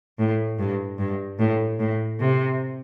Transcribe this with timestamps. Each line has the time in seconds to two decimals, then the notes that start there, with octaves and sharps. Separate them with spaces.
0.19 A2
0.58 G2
0.98 G2
1.39 A2
1.79 A2
2.19 C3